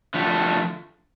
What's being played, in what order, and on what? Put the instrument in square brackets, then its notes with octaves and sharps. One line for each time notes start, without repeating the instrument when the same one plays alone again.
[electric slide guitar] D3 F3 A3